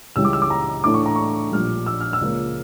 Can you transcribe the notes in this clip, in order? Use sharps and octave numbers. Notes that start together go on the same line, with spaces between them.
C#2 C#3 E3 G3 E6
D6
E6
D6
A#5
A2 E3 A3 D4 D6
C#6
A#5
C#6
A#1 A#2 G3 F6
E6
F6
E6
C#2 C#3 F3 A#3